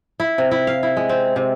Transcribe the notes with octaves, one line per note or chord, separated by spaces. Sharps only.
E4
C3
E4
F5
E4
G#3
C4
C3